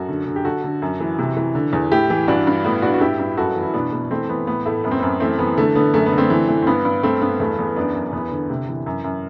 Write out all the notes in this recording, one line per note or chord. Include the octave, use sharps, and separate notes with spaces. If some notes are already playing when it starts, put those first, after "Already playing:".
Already playing: F#2 F#4 A4
D3
D3
G4
D3 F#4 A4
D3
F#2
E3
C3
E3
D3
E2
A2 E4 G4
E3
G2 D4 F#4
G2
A2 B3
A2 D4 F#4
F#4
G2 E4 G4
G2
F#2 F#4 A4
E3
E4
B2 B3 D4
B2
E3 A3 C4
E3 B3
A2 B3
A2 A3
F#2 B3
C4
F#2 B3
E3 A3 C4
E3 B3
D3 A3
D3 B3
F#2 A3
B3
D3
A3 C4
E3
E3
C4
G2 B3
G2
G2 A3 C4
G2 B3
E2 A3
E2 B3
F#2 B3 D4
F#2
E2 B3
D3
C3
E3
F#2
F#2